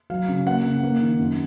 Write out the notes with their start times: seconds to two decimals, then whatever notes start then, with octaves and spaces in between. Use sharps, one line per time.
0.10 F#3 F5
0.29 C#3
0.46 A#3 F#5
0.65 C#3
0.83 A#3
1.01 D#3
1.19 F#2